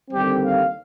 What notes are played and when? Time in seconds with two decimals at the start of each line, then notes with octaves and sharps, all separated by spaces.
0.10 D#2 D3 G3 C4 G4
0.41 F5